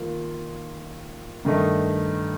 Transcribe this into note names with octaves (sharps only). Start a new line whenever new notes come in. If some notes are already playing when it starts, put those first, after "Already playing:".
Already playing: D#3 A#3 F4
G2 D#3 A3 D#4